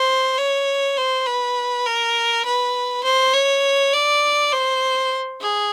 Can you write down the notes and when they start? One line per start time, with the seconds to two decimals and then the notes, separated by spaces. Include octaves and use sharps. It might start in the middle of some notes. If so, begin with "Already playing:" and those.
Already playing: C5
0.38 C#5
0.97 C5
1.26 B4
1.86 A#4
2.45 B4
3.04 C5
3.33 C#5
3.93 D5
4.52 C5
5.41 G#4